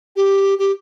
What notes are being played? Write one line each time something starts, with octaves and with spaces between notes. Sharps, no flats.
G4
G4